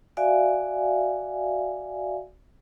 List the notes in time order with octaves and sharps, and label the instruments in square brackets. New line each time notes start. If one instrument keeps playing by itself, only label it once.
[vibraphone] F#4 D5 E5 F5 G#5